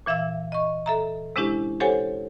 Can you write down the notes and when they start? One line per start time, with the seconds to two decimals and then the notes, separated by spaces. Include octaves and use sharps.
0.06 A#2 E3 E5 F5 E6
0.52 D#5 C#6
0.86 A4 E5 A#5
1.36 C3 G#3 C#4 D4 E4 G4
1.80 G4 A4 C5 C#5 F#5 G#5